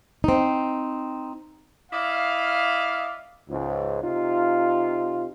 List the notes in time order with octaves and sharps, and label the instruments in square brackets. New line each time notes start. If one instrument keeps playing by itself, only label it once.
[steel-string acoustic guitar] C4 D#4
[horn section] E4 D5 D#5 F5
[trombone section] C#2 G#2
C3 D#4 F4